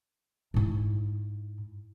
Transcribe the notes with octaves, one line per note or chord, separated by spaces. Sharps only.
G#2 E4